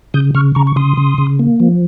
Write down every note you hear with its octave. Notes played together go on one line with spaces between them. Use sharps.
C#3 D#6 G6
C#3 C#6 F6
C#3 A#5 C#6
C#6
C#3 C6 D#6
C#3
C#3
A#3
F3